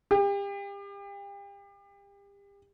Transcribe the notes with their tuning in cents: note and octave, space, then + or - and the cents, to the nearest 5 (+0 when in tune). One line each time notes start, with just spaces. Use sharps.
G4 +35